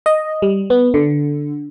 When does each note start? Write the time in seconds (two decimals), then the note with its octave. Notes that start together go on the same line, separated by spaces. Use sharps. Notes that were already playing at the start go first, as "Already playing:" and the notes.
0.06 D#5
0.42 G3
0.70 B3
0.94 D3